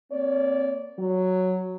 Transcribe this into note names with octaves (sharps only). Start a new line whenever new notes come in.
A#3 C4 C#5 D5
F#3